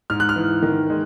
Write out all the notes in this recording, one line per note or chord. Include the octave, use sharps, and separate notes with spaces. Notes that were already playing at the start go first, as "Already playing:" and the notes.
G#2 F6
F#6
F6
E3
D#3
G#3